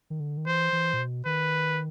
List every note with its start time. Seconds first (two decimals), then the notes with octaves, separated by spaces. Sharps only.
0.10 D#3
0.20 D3
0.38 D#3
0.47 E3 C5
0.73 E3
0.94 A#2
0.99 B2
1.25 D#3 B4